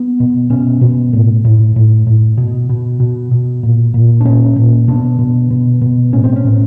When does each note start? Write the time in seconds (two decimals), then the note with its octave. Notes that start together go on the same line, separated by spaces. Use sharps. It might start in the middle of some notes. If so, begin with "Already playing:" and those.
Already playing: B3
0.20 B2
0.50 B2 C#4
0.81 B2
1.13 A2
1.45 A2
1.76 A2
2.07 A2
2.37 B2
2.69 B2
3.00 B2
3.31 B2
3.63 A#2
3.94 A#2
4.21 D4
4.25 A#2 C#4
4.56 A#2
4.88 B2 D4
5.19 B2
5.51 B2
5.81 B2
6.12 A2 C#4
6.24 C4
6.36 C#4
6.45 A2